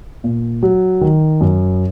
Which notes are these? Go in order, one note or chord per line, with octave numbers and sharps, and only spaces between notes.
A#2
F#3
D#3
F#2